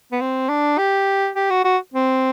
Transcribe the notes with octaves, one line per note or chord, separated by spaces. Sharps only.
B3
C4
D4
G4
G4
F#4
F#4
C4